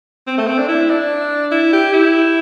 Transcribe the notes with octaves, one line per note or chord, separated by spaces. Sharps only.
C4
A3
C4
D4
E4
D4
E4
G4
E4